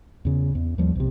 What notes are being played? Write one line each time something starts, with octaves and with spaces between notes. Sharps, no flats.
E2 C#3
E2
D#2 F3 G3
B1 C3